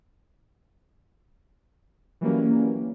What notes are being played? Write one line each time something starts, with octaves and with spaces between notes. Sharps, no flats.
E3 F#3 G3 A#3 C#4